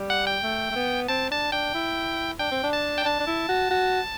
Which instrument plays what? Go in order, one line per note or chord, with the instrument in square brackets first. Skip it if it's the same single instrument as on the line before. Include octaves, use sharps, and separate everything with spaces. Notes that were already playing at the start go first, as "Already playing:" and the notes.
Already playing: [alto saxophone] G3
[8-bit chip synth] F#5
G5
[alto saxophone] A3
A3
B3
[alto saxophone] C4 [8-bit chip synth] A5
[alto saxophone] D4 [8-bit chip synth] A5
[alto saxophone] D4 [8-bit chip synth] G5
[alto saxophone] E4
[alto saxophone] D4 [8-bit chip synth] G5
[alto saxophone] C4
D4
[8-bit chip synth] A5
G5
[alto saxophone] D4 [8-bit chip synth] A5
[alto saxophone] D4
E4
F#4
F#4